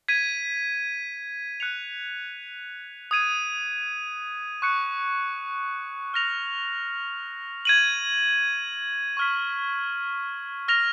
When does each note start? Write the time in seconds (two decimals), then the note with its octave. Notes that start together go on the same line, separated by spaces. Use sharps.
0.08 G#6 B6 D#7
1.60 F#6 C#7 F7
3.11 D#6 G#6 D#7
4.62 C#6 F#6 C#7
6.14 F6 A#6 F7
7.65 G#6 D#7 F#7
9.17 C#6 F6 B6
10.68 F6 A#6 F7